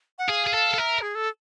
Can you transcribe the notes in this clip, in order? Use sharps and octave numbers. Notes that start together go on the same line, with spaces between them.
F#5
G#4 F5
G#4
A4
A4
A#4 E5
G#4
A4